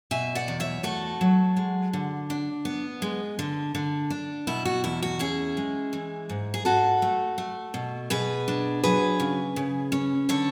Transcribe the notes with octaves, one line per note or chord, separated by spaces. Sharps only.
B2 E5 G#5
D5 F#5
E2
C#5 E5
A3 F#4 A4
F#3
G#3
D3
D4
B3
G#3
D3
D3
D4
B2 E4
F#4
E2 E4
F#4
C#4 E4 G#4
G#3
E3
G#2
G#4
G#2 F#4 A4
A3
A3
B2
B2 G#4 B4
D4
F#3 G#4 B4
C#3
C#3
C#4
D3 A4 C#5